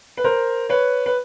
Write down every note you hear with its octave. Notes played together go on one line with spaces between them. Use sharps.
B4
A#4 C5
B4 C#5
B4